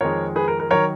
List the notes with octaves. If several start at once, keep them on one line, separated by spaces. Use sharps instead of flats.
F2 D#3 G#3 A#4 C#5
G#4 B4
A#4
A#4
D#3 F#3 A#4 C#5